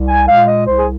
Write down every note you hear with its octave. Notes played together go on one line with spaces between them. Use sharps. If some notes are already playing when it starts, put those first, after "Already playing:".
Already playing: C2
G#5
A#2 G#3 F5
D#5
C2 C5
G#4